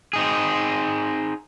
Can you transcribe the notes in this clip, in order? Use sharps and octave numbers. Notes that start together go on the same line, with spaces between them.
C4 D#4 G#4